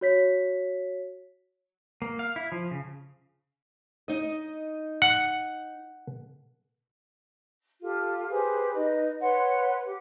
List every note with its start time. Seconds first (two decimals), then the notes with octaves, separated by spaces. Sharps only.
0.01 F#4 C#5 B6
2.02 A#3
2.19 F5
2.36 E4
2.52 F3
2.71 C#3
4.08 D#4 D#5
5.02 F#5
7.81 F4 G4 A4
8.29 G4 G#4 B4 C5
8.74 D#4 B4 D#5
9.21 B4 C#5 F#5 C6
9.83 G4